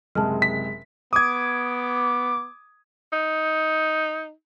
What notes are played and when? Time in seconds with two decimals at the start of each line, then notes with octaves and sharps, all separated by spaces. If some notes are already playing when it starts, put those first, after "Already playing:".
0.15 F#1 C3 G#3 A5 F6
0.42 B6
1.13 B3 D6 D#6 G#6
3.13 D#4